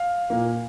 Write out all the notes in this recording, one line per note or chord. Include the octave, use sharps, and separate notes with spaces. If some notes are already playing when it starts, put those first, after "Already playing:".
Already playing: F5
A#2 A#3